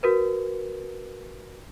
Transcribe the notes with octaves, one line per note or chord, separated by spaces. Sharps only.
F#4 A#4 B4